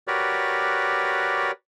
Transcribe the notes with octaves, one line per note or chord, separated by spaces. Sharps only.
F#4 G4 A#4 B4 C#5 D5